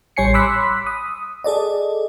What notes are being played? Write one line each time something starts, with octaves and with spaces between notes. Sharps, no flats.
A1 G3 C#5 G#5 C7 C#7
B5 C6 D6 E6 F#6 B6
D#6
G#4 A4 D5 D#5